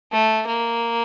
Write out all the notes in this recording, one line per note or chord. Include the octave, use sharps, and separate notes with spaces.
A3
A#3